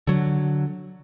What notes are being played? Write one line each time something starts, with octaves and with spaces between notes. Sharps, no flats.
D3 F#3